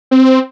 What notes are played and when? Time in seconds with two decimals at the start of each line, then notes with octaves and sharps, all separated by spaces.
0.11 C4